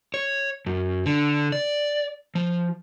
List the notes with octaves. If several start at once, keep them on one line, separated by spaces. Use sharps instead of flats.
C#5
F#2
D3
D5
F3